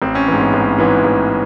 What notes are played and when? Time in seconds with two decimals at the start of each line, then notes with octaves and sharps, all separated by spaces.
0.02 A1 C4
0.15 C#4
0.28 G#2 E3
0.40 B3
0.53 A1
0.78 G#2 E3
1.04 A1